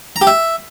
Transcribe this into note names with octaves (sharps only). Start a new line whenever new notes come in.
A#5
G4
E5